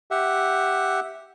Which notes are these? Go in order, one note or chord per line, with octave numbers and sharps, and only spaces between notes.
G4 E5 F#5